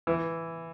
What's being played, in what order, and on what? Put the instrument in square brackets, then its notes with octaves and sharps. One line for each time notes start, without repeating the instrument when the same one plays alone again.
[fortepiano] E3